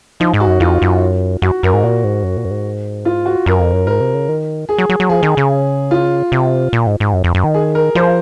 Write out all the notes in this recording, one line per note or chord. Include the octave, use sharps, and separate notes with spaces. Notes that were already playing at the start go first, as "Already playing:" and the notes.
F3 D#4
G#2
F#4
F#2
F2 F4
F#2
F#2 F#4
F#2 A#4
G#2
A#2 F#4
G#2
F#2
A#2
F#2
G#2
F4
F#4
F#2 A#4
F2
F#2
G#2 A#4
C3
C#3
D#3
G#4
F#3
F#3
F#3
F3 G#4
D#3
C#3
F4
C3
A#2
G#2
G#2
F#2
F2
F#2
D#3
G#4
A#4
F3 C5